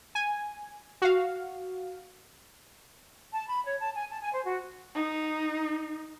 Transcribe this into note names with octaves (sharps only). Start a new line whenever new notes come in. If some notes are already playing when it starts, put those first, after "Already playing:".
G#5
F#4 F5
A5
B5
C#5
A5
G#5
A5
G#5
C5
F#4
D#4